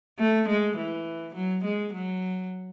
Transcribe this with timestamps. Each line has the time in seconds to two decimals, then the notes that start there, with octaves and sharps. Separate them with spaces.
0.19 A3
0.48 G#3
0.77 E3
1.35 F#3
1.65 G#3
1.93 F#3